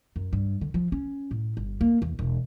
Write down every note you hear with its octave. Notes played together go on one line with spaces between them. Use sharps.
F#2
G2
D3
F3
C#4
A2
G1
A#3
E2
E1